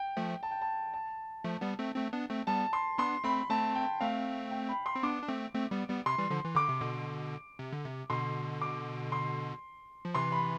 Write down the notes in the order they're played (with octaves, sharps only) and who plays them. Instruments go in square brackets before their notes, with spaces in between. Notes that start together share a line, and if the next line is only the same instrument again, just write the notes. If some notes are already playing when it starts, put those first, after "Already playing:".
Already playing: [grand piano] G5
[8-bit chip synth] F3 A3
[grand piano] A5
G5
A5
A5
[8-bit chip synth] F3 A3
G3 B3
A3 C4
A3 C4
B3 D4
A3 C4
[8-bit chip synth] G3 B3 [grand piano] A5
[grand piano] C6
[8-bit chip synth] B3 D4 [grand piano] C6
[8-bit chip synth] A3 C4 [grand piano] B5
[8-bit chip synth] A3 C4 [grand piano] A5
[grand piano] G5
[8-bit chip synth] A3 C4 [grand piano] F5
[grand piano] G5
B5
C6
[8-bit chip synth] C4
[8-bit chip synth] B3 D4 [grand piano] D6
[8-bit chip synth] D4
A3 C4
A3 C4
G3 B3
G3 B3
[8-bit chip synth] C3 [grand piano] C6
[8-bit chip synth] E3 G3
D3 F3
E3
[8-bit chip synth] D3 [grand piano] D6
[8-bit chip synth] C3
B2 D3
C3
D3
C3
[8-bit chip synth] B2 D3 [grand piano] C6
[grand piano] D6
C6
[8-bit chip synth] F3
[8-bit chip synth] C3 E3 [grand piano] C6
[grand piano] B5